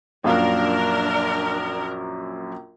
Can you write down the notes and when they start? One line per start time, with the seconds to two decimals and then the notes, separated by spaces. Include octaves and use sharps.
0.24 A#1 F#2 D4 A#4 F5